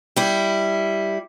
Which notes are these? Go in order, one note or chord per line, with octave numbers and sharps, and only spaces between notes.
G3 E4